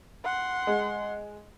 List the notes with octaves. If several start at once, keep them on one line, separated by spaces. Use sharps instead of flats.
F#5 C6
G#3